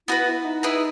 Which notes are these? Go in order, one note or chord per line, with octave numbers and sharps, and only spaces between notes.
B3 E4 F#4 B4
E4
D#4
E4 G#4 B4